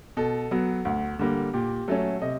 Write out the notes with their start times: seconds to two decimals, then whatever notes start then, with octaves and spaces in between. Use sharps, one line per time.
0.17 B2 A4
0.51 F#3 B3
0.85 D2
1.19 D3 G3 A#3
1.54 A#2 G4
1.88 F#3 A3 C#4 A4
2.22 C3 D#5